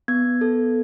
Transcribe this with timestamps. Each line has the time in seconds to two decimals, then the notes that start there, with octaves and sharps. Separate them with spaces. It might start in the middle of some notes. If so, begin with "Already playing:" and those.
0.08 B3 G#6
0.41 A4